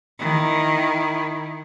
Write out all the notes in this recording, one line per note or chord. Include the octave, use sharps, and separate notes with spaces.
D#3 E4